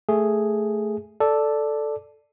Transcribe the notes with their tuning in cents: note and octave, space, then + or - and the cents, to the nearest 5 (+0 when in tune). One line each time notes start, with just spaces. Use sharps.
A3 +0 G#4 +0
A4 +0 D5 +0